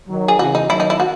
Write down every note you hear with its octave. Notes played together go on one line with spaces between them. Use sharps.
D#3 F#3
G#4
C#3 E3 F#4
D#4
D#3 F#3 E4
D#4
E4
F#4